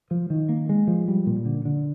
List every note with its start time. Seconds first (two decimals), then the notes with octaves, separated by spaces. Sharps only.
0.11 F3
0.30 D#3
0.49 A#3
0.69 G#3
0.88 F3
1.08 G3
1.26 A#2
1.46 D3
1.65 D3